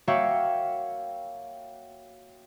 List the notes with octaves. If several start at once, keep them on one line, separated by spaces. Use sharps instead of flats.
A#3 F#4 C#5 E5 F5 G5